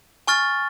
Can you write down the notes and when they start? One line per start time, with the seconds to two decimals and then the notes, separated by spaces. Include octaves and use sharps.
0.27 G#5 C#6 F6 A6